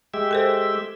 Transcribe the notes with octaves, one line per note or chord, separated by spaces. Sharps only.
G#3 G4 E5
A4 A#4 C5